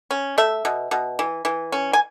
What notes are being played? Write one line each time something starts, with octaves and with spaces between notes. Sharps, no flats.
C#4
A3 E5
B2
B2
E3
E3
C#4
G#5